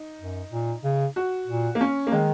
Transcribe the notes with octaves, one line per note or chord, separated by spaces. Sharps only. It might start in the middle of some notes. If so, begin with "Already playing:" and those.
Already playing: D#4
F#2
A#2
C#3
F#4
A#2
A#3
C#4
A#3
D#3 G#3